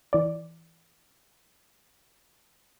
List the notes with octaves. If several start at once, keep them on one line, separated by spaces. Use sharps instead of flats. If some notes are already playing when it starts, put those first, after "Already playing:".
E3 D5